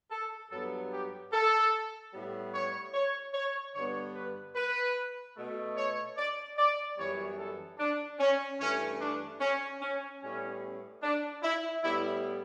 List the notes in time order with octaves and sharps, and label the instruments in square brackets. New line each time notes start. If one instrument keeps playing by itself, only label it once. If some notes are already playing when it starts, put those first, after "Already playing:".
[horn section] A4
G2 F#3 B3 A4
G4
A4
A2 G3 B3
C#5
C#5
C#5
G2 D3 G3 B3 C#5
B4
B4
B2 A3
C#5
D5
D5
F#2 E3 G3 B3 C#5
A4
D4
C#4
G2 E3 A3 C#4
D4
C#4
C#4
A2 G3 B3 C#4
D4
E4
A2 G3 B3 E4